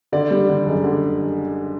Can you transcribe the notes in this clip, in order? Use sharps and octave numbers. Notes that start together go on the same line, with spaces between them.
D3 D5
G3
D3
F#1
D3